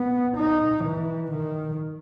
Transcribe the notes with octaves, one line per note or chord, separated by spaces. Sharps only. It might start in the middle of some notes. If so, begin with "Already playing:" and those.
Already playing: B3
D#4
E3
D#3